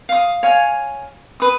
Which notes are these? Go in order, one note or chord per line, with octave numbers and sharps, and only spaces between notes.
F5 D#6
C#5 F5 G#5
B4 D#6